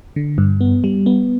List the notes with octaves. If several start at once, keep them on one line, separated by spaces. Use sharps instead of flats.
D3
G2
B3
G3
B3